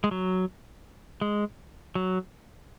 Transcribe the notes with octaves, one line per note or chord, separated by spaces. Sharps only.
G#3
F#3
G#3
F#3